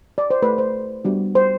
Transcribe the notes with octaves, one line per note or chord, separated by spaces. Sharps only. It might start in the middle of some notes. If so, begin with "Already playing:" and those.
D5
C5
A3 E4 G4 B4
C5
G3 B3 D4 F#4
C5